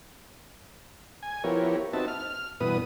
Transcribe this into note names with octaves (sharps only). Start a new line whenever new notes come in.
G#5
F3 B3 E4 G4 A#4 C#5
B3 C4 D#4 F#4 E5 A5
F6
G2 B2 E3 B3 B4 D#6